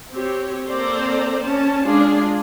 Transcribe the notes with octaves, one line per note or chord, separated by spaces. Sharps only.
C4 G4 C#5
A#3 C4 A4 C5 D5 A#5
C#4 A5
G#3 D4 F4 G#4